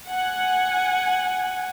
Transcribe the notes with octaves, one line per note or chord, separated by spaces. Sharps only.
F#5 G#5